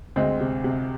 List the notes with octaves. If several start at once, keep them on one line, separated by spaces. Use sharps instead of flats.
D2 G#3 C4
C3
C3